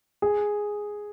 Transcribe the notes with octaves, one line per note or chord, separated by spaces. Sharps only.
G#4